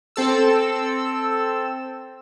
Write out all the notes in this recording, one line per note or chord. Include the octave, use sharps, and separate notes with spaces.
C4 A4 E6